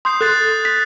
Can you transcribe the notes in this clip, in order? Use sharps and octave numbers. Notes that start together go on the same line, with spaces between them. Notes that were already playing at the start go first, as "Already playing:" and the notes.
C6 D#6 G6 C7
A4 F#6 A6 C7
B6